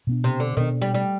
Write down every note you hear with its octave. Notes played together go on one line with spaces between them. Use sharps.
B2 B3 D4
C3
D3
B2 D#3 B3 D4
G3
G3